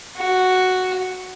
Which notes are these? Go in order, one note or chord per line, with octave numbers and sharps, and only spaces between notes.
F#4